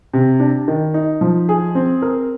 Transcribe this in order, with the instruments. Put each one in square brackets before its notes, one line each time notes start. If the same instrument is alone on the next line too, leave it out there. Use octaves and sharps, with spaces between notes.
[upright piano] C3
D4
D#3
D#4
F3
G#4
C4
A#4